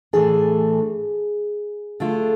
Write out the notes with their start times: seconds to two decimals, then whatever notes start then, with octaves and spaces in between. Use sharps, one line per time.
0.13 A2 E3 A3 D4 G#4
2.00 D3 A3 D4 F4